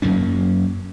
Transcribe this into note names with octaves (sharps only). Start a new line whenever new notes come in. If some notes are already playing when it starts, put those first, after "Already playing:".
F#2 F#3 A#3 C#4